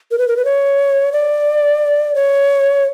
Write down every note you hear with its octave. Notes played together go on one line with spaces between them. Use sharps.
A#4
B4
A#4
B4
C#5
D5
C#5